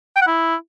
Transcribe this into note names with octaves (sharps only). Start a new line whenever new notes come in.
G5
F#5
E4